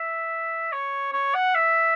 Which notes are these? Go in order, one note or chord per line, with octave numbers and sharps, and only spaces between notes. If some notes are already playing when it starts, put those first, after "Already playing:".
Already playing: E5
C#5
C#5
F#5
E5